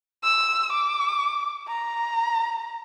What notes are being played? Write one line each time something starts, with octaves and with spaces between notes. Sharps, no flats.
E6
D6
A#5